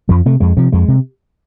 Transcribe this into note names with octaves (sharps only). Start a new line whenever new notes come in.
F2 F3
C3 A3
F2 G#3
C3 F3
F2 G#3
C3